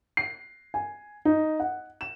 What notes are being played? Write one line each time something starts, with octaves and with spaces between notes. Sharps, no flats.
C7
G#5
D#4
F#5
E7